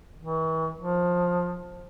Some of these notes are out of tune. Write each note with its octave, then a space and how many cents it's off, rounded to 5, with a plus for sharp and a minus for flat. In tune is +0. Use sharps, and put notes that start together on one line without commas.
E3 -40
F3 +15